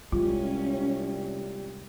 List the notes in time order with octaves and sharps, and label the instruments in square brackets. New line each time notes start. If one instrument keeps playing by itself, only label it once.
[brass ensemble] C2 A#2 G4 [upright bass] G#3 [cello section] C#4 [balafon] F4